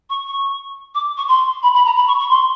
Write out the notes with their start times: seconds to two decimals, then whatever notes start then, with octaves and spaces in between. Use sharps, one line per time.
0.10 C#6
0.27 C#6
0.95 D6
1.17 C#6
1.28 C6
1.63 B5
1.74 B5
1.85 A#5
1.96 B5
2.07 C#6
2.19 C#6
2.30 C6